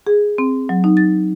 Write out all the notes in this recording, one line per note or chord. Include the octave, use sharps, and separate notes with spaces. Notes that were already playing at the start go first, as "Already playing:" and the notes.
G#4
C4
F#3
D#4
A6